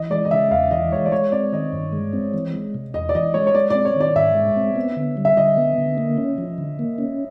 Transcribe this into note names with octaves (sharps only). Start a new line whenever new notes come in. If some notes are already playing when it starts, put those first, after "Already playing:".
Already playing: E3 D#5
G#3 D5
D#5
C#3 E5
E2 F5
E3 D#5
G#3 C#5
D5
G#3 C#5
C4 D5
D#3 D#5
G2
G#3
C4
E3
G#3
C3
E2 D#5
D5
E3 D#5
G#3 C#5
C#5
G#3 D5
C4 D5
C#5
D#3 D5
G#2 E5
G#3
C4
B3
D3
G3
E5
D3 D#5
B3
D3
A#3
C#4
F3
D3
A#3
C#4